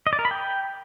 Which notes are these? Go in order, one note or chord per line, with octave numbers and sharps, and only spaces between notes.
D#5
D5
A#4
B5
G5